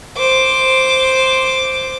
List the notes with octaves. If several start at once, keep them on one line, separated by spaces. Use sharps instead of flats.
C5 D6